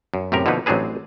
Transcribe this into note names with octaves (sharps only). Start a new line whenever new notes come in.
F#2
F#2 A2 C3 G4 A#4
B2 D3 F3 A#3 D#4 B4
A1 F#3 C4 D4 G#4 B4